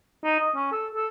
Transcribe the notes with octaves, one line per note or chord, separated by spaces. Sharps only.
D#4
D#5
C#4
A4
A4